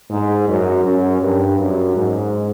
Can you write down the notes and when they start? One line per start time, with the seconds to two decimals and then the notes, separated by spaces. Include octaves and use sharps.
0.10 G#2
0.47 F#2
0.85 F#2
1.21 G2
1.59 F#2
1.96 G#2